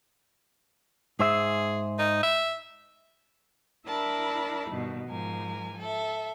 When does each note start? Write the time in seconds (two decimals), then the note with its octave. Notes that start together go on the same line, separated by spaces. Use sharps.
1.19 G#2 G#4 C5 E5
1.99 D#4
2.23 E5
3.87 D4 E4 A#4 E5 A5 B5
4.70 G2 B2 D#3
5.08 G#2 F3 A#4 G#5
5.78 A4 E5